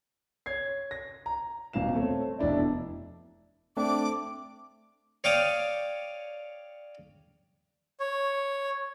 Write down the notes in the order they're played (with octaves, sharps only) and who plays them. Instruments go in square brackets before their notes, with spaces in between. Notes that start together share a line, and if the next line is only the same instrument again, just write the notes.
[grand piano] C#5 G#6 C7
A#6
A#5
D#1 B2 F5 E7
A3 C4 C#5
F1 B2 D4 E4 D5
[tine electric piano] A3 C4 D4 [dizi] D6
[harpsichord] C#5 D5 F5 G5 D6 D#6
[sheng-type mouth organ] C#5